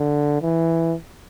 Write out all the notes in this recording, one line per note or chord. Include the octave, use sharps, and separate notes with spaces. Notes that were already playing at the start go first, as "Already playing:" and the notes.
Already playing: D3
E3